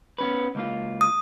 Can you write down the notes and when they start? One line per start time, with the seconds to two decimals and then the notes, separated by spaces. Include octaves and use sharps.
0.18 B3 C#4 B4
0.55 C#2 A#3 F4
1.01 D#6